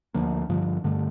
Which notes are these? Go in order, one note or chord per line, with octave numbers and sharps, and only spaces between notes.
D2 D3 F3 A#3
G2 D3 F3
G2 D3 A3